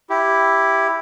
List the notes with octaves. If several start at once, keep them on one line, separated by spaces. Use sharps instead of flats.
E4 G4